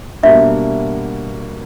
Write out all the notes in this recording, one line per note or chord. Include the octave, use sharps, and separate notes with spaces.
B2 G3 A#3 D4 E5